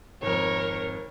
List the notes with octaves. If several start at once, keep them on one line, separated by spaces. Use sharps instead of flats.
G#1 F2 A#4 C#5